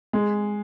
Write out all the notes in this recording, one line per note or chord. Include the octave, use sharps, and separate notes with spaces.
G#3